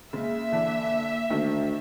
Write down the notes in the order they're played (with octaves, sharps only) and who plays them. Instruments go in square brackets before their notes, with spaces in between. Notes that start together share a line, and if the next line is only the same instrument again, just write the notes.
[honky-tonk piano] C#3 G#3 [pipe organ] A#3 [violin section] E5
[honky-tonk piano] D3 E3 D4
[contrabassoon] D2 [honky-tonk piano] D#3 D4